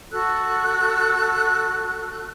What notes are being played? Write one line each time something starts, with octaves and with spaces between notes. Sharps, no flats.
F#4 A4 E6 F#6